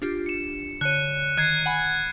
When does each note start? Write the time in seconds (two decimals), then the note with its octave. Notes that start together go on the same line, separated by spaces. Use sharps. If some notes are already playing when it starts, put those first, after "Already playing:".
0.02 D4 F4 G4
0.26 C#7 E7
0.81 D3 C#5 F#6 C#7 D#7
1.37 D#3 F#6 G#6 C7 D#7
1.66 F#5 G#5 B5